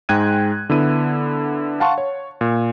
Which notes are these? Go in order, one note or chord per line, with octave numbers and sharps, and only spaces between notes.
G#2 G#3 G5 F#6 G#6 D#7
D3 B3 E4 D#7
F5 F#5 A5 C6 C#6
C#5
A#2